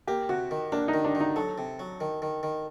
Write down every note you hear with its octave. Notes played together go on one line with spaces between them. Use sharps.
A#3 G4
C3 F#4
D#3
A#3 D4
D#4
D#3
D4
D#3
D#4
F#3 A4
C3
F#3
D#3
D#3
D#3